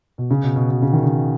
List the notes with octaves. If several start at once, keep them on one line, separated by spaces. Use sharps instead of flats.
B2
C#3
B2
B2
B2
C#3
D#3
C#3